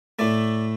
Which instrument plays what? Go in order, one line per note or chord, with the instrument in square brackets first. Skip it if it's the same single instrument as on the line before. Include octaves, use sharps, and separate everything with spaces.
[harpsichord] A2 A3 D5